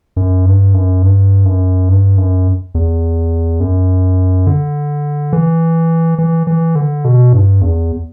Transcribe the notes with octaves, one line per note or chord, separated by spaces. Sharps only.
F#2
G2
F#2
G2
F#2
G2
F#2
E2
F#2
D3
E3
E3
E3
D3
B2
G2
E2